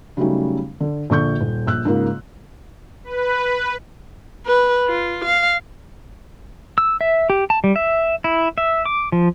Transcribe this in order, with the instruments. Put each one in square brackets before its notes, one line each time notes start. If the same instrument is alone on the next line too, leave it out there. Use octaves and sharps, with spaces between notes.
[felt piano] C#3 F#3 G3 A3 C#4 D#4
D3
A#1 D3 C#6 G6
D#1
A#1 E6 F#6
G#2 C#3 A#3 F4
[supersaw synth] B4
[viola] B4
F4
F5
[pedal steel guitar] E6
E5
G4
A5
G3
E5
E4
E5
D6
F3